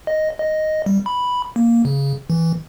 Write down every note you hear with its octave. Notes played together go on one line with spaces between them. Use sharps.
D#5
D#5
G3
B5
A#3
C#3
E3